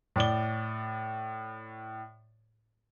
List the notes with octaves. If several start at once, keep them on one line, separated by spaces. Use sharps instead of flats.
A2 D5 G7